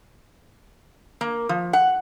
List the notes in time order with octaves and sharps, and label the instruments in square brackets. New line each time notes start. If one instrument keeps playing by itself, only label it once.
[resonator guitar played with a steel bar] A#3
F3
F#5